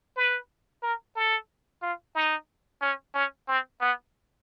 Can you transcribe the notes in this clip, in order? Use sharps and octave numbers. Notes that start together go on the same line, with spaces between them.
B4
A#4
A4
F4
D#4
C#4
C#4
C4
B3